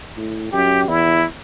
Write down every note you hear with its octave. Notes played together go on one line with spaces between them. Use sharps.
A2
F#2 G4
E2 E4